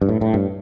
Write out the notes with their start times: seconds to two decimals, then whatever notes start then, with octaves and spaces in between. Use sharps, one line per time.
0.02 G2
0.09 A2
0.21 A2
0.34 G2